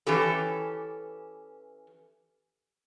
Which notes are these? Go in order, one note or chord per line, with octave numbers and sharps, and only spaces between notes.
E3 C#4 G4 A4